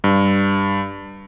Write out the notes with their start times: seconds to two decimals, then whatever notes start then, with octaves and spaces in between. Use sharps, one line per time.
0.04 G2